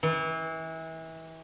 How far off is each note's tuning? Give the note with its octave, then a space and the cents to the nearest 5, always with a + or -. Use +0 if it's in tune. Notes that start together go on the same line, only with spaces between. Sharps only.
E3 -30